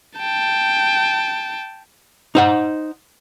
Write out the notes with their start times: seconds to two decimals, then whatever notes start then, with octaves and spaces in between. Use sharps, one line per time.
0.19 G5 A5
2.35 D#4 C5 F#5